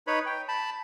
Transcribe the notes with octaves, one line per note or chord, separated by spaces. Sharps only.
D#4 B4 C#5 B5
G5
A5 B5